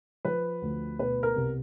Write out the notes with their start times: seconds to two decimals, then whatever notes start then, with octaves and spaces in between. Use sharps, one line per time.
0.25 F3 B4
0.62 D2
0.99 B2 B4
1.23 A#4
1.36 C2